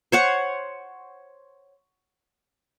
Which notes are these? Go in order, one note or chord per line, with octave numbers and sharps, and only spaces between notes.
C5 C#5 F#5